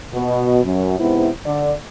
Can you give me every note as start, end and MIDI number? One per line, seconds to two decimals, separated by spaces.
0.14 0.60 47
0.65 0.99 42
0.99 1.29 44
0.99 1.29 48
0.99 1.29 59
0.99 1.29 64
1.46 1.73 50
1.46 1.73 74